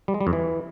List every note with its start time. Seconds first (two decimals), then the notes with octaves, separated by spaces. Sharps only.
0.08 G3
0.14 G#3
0.21 G3
0.27 F2
0.33 E3